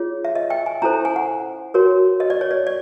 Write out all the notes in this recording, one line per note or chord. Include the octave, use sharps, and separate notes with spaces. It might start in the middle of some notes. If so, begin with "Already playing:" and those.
Already playing: F4 G#4 C#5
E5
D#5
G5
G#5
C#4 E4 A4 C5 A#5
G#5
F#5
F#4 A#4 C#5
D#5
D5
C#5
D5
D5